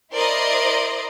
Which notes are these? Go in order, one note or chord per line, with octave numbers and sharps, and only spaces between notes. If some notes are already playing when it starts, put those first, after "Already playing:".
E4 A#4 C5 D5 D#5 C6